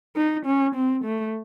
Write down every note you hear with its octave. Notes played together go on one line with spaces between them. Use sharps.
D#4
C#4
C4
A3